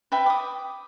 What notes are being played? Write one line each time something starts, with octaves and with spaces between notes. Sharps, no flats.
B4 E5 G5
D6 D#6